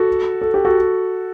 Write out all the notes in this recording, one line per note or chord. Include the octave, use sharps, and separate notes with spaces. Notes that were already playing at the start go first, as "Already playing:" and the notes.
Already playing: F#4 A4
A4
G4
F#4 A4